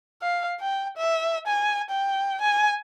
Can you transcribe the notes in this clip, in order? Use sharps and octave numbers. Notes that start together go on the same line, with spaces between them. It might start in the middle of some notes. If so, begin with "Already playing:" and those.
F5
G5
E5
G#5
G5
G#5